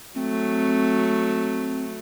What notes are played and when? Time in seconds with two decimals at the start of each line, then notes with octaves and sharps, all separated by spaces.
0.15 F#3 A3 C4